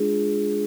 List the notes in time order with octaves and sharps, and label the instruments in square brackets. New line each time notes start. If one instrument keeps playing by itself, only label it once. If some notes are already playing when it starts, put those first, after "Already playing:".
Already playing: [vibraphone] G#3 D4 F4 G#4